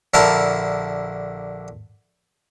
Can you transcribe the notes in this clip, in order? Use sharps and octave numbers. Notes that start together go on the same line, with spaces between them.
A#1 D3 E4 A#4 A5